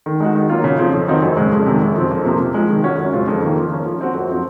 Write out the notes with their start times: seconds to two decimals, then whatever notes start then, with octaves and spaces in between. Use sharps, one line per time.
0.06 D#3
0.20 G#3 D#4 F#4
0.35 D#3
0.50 F#3 A#3 F4
0.64 C#3
0.78 F3 C4
0.94 F2
1.07 D#3 F#3 C4 D#4
1.22 F#2
1.37 C#3 G#3
1.52 F2
1.66 C3 D#3 G#3
1.82 F#2
1.95 F3 C4
2.11 F2
2.25 C3 F3 A#3
2.40 C3
2.54 F3 G#3
2.69 D#3
2.83 F#3 C#4 F#4
2.98 F#2
3.13 C#3 G#3 C4 F4
3.28 F2
3.42 D#3 A#3
3.57 F3
3.71 A#3 C#4
3.85 F3
4.01 C4 F#4
4.15 F#2
4.29 F3 C4 F#4